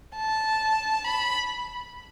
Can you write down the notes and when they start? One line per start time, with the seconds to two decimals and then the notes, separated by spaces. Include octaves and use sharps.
0.16 A5
1.05 B5